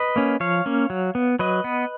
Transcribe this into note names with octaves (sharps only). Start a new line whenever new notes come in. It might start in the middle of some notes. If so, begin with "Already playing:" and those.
Already playing: B4 D#5
A#3 C#4
F3 C#5 F5
A#3 C#4
F#3
B3
F#3 B4 D#5
B3